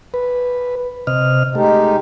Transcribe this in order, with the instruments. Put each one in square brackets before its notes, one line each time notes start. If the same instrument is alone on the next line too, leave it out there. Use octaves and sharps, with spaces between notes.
[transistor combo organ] B4
C3 D#5 F6
[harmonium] G#3 D#4 G4 [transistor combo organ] A3